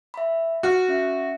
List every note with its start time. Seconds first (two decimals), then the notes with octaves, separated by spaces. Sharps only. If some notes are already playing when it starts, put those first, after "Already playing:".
0.14 E5 B5
0.63 F#4 F6 F#6
0.88 C#4 E5